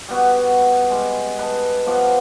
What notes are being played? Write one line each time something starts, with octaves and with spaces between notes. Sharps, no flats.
G3 B3 F#4
G3 G#3
B4 D#5 A5
F3 B3 D6